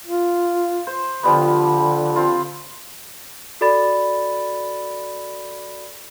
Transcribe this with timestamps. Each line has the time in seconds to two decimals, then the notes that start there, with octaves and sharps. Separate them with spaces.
0.07 F4
0.87 C5
1.23 D3 F3 G3 B3
2.16 C4 F4
3.61 F#4 A4 D5 B5 A6